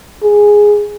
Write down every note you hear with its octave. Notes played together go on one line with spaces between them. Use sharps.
G#4